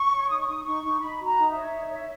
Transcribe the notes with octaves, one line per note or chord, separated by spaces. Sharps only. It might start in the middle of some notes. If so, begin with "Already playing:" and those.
Already playing: C#6
C#5
D#4 D#6
C#6
D#4 D#6
D#4 C#6
D#4
D#4 B5
F#4 A#5
D#4
E5
C#5
D#4
C#5